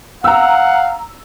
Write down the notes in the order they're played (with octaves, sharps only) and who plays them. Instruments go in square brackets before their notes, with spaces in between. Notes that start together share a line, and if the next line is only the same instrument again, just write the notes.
[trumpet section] F5 F#5 [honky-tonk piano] A#5 E6